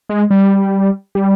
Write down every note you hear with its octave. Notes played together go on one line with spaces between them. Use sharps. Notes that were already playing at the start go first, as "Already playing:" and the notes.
G#3
G3
G3